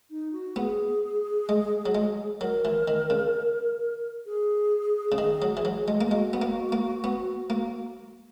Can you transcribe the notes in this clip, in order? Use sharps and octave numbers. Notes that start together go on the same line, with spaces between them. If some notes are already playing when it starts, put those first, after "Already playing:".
D#4
F#4
B3 G#4
G#3
F#3
G#3
F#3 A#4
E3
D#3
C#3
G#4
C#3
D#3
F#3
E3
F#3
G#3
A#3
G#3 F#4
B3
A#3
A#3
B3
A#3